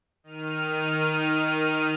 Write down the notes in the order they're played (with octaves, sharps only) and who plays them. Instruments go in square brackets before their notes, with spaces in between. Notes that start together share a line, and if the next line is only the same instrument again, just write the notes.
[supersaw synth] D#3 F6 D#7